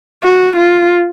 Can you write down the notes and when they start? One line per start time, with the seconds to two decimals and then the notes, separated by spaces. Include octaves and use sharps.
0.23 F#4
0.57 F4